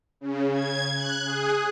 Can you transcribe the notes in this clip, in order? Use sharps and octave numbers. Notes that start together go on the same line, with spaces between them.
C#3
G#6
F#6
G#4